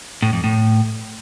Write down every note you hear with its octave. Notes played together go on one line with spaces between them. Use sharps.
A2
F2
A2